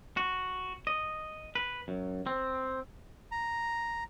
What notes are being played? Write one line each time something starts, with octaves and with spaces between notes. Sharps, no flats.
F#4
D#5
B4
F#2
C4
A#5